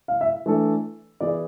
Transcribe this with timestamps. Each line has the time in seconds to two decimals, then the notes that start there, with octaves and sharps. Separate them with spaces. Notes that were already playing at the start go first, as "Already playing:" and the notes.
0.08 F5
0.21 E5
0.46 E3 A3 D4 A4
1.20 E3 B3 E4 G#4 D5